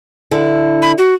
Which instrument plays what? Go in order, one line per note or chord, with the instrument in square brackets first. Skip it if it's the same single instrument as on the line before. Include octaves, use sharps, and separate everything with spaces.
[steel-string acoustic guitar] D3 E4
[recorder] B5
F#4